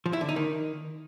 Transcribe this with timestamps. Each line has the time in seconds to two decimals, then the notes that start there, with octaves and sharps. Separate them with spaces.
0.06 F3
0.13 E4
0.21 D3
0.29 D#4
0.36 D#3